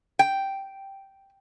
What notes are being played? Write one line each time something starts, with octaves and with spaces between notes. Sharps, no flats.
G5